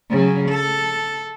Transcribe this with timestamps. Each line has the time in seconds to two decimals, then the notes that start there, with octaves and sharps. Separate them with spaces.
0.11 C#3 F#3
0.49 A4